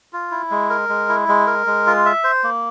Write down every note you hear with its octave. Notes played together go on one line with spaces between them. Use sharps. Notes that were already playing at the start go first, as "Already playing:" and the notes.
F4
E4
G#3
A#4
G#3
E4
G#3
A#4
G#3
F4
E5
C5
A#3